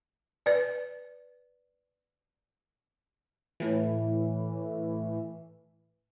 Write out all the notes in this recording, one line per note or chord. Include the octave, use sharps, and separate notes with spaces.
B4 D5
A2 E3